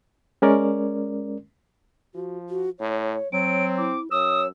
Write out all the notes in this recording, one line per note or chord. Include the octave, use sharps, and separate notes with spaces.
G#3 C#4 A#4 D5
F3 F#4
F#4
A2 C#5
F#3 C4 C#5 D7
E4 D6
F#2 C#5 D#6 E6